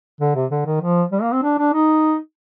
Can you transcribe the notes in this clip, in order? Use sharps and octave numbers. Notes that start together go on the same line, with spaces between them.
D3
C3
D3
D#3
F3
G3
A#3
C4
D4
D4
D#4